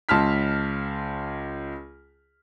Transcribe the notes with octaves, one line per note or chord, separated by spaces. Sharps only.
C#2 A5 C6 F6 B6